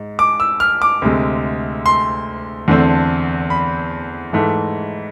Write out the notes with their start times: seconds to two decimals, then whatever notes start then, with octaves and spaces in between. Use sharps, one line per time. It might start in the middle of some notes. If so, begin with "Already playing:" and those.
Already playing: G#2
0.19 D6
0.40 E6
0.60 F6
0.82 D6
1.02 D2 C3 G#3
1.86 C6
2.68 E2 D3 A3 C4
3.50 B5
4.33 G#2 E3 A3